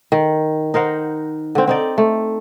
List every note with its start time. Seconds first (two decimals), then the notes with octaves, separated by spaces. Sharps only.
0.12 D#3
0.74 D#4 A#4 C5 F#5
1.55 D3 C4
1.68 C4 D#4 D5
1.98 A3